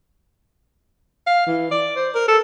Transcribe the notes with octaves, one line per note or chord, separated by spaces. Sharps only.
F5
E3
D5
C5
A#4
A4